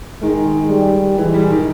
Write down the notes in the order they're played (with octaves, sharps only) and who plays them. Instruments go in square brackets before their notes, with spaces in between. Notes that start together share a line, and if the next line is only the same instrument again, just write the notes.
[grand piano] D#3 [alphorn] G#3
[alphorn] G3
[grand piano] E3 [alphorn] G#3
[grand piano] G3
D#3